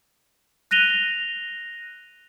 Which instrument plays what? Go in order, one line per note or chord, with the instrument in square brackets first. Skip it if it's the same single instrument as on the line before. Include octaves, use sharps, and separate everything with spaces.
[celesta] F#6 A#6 D#7 F7 G7